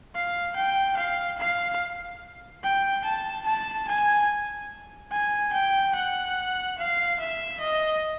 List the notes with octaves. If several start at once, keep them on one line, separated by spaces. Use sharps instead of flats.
F5
G5
F5
F5
G5
A5
A5
G#5
G#5
G5
F#5
F5
E5
D#5